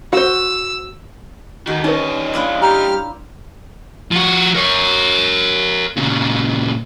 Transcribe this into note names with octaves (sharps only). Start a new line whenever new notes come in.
F#4 C5 F#5 E6
D#3 F#4 A4
G3 C#4 D#4 B4 D#5
D4 E4 F4
G4 A#5 F6
F3 F#4
A#4 C#5
A#2 C#3